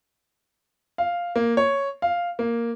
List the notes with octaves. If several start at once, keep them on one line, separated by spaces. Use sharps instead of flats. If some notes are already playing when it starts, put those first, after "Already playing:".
F5
A#3
C#5
F5
A#3